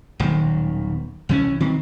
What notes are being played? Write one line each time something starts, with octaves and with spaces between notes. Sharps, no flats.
D#1 B1 D#3
C2 E3 G#3 C#4
D#3 C4